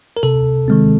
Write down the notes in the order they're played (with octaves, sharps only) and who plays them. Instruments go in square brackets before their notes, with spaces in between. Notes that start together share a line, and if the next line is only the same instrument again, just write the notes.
[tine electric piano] A#4
C3 A4
D#3 G#3 C4